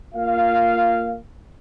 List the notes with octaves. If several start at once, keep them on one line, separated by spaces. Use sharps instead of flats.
A#3 F4 F5